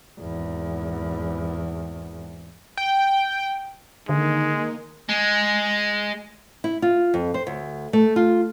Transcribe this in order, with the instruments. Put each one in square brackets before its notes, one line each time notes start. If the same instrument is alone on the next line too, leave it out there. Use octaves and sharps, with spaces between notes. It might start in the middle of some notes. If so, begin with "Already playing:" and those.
[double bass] G#1 E2
[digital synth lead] G5
[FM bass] D3 [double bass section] D#3 A#3 [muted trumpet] G#3 [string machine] D#4
[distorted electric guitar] G#3
[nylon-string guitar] E4
F4
F2
C5
D2
A3
F4